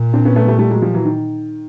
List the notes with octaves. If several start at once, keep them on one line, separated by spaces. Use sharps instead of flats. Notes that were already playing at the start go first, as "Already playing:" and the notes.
Already playing: A#2
C4 D4
B3 C#4
A3 B3
G3 A3
G3 A3
F#3 G#3
F3 G3
E3 F#3
D#3